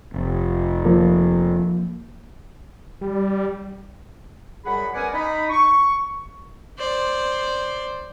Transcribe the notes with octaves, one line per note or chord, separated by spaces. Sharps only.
F1
F3 A#3
G3
F#2 G3 G#4 F#5 B5
B3 C#4 A#4 D5 F#5 G#5
D#4 D#5 B5
C#6
C5 D5